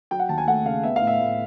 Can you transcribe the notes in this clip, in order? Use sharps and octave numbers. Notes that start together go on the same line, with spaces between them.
F#3 G5
F#5
D#2 A5
G#5
A3 F#5
C#3 F5
B3 E5
A2 F5
E5
A2